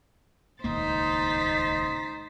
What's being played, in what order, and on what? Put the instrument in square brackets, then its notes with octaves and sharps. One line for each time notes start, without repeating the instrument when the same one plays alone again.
[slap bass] D#1 C#2 A#3 [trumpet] D#4 [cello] C5 [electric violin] A6 B6